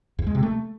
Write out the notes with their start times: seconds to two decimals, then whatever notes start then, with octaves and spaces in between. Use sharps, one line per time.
0.19 E2
0.27 G#3
0.35 C3
0.43 A3